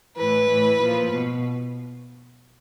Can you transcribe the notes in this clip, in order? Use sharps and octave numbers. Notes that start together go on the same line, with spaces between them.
A2 E3 B4
A2 E3
A#2 F3
B2